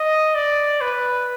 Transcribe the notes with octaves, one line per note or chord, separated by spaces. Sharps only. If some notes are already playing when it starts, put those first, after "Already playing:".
Already playing: D#5
D5
B4